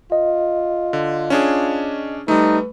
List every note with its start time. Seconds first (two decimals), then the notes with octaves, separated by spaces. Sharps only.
0.12 F4 D#5
0.93 D3
1.30 C#4 D4 G#4
2.28 G3 A3 D#4 B4